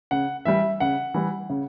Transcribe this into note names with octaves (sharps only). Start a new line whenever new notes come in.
C#3 F#5
E3 G3 E5
C#3 F#5
E3 G3
C#3